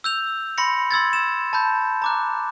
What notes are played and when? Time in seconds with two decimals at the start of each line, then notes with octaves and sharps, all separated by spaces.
0.04 E6 G6 F7
0.58 B5 C6 A#6 C#7
0.91 C6 E6 G#6 A6
1.13 E7
1.53 A5 B5 G6
2.02 A#5 D6 F#6